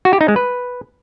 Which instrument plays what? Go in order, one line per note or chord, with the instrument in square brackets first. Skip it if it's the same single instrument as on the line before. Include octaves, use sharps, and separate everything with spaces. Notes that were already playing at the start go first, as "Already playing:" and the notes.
[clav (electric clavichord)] F#4
G4
D#4
G#3
B4